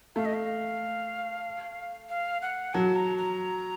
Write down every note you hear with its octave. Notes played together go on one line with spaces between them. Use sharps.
A3 F5
D#5
F5
F5
F#5
F#3 A5
A#5
A#5